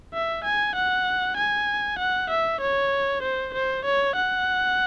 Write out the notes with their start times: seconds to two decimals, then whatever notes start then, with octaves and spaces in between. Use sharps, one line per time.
0.14 E5
0.44 G#5
0.76 F#5
1.37 G#5
1.99 F#5
2.30 E5
2.61 C#5
3.23 C5
3.54 C5
3.85 C#5
4.16 F#5